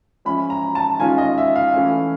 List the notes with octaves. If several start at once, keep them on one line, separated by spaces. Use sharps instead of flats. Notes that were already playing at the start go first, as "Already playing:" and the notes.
F3 G#3 C#4 E4 B5
A#5
A5
D#3 G#3 C#4 F4 G#5
D#5
E5
F5
E3 A3 C#4